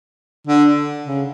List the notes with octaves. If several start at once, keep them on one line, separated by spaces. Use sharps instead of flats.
D3
C#3